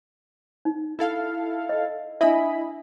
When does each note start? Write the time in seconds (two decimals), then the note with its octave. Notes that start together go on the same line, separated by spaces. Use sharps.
0.65 D#4
0.99 E4 A4 F5
1.69 D#5
2.21 D4 E4 D#5 E5 B5